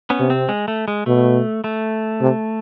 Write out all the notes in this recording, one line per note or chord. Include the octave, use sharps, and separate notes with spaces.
B3 C#4
C3
C4
G#3
A3
G#3
B2 A3
A3
C3